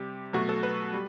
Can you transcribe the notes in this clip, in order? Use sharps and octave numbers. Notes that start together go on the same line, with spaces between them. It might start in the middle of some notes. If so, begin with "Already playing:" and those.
Already playing: C3 G3 G4
B2 F#3 A3 F#4
A4
B4
G3